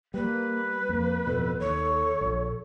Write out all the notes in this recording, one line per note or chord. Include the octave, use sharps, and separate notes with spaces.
G3 A#3 B4
F2 A#3
D1 F2 B2 A4
D#2 C#5
A#1